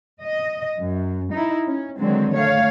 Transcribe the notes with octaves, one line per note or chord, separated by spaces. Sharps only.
D#5
F#2
D#4 E4
C#4
D3 D#3 F#3 G#3 C4
A3 C#5 F5